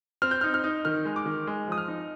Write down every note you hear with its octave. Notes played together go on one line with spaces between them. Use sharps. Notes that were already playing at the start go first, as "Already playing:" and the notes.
C4 F6
G6
D#4 F6
F6
D#4
D#3 F6
G#3
D6
D#3
G#3
F3 D#6
F6
D#4